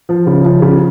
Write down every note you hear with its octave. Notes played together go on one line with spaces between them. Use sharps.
F3
C#3
F3
C#3